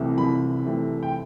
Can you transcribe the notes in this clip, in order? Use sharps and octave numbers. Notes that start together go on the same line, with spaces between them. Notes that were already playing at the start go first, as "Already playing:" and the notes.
Already playing: C2 C3 E3 A3 C4
C2 B5
C3 E3 A3 C4
G5